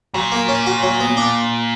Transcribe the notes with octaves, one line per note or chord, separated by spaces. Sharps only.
A#2 F#3
A#3
C#4
F#4
F#3
B3
D4